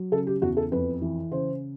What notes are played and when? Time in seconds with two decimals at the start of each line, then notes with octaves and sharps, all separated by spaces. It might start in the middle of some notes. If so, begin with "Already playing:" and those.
Already playing: F#3
0.12 C#3 A4
0.27 G4
0.42 E2 F#4
0.57 A4
0.72 F2 B4
1.02 E3
1.31 C#3 C5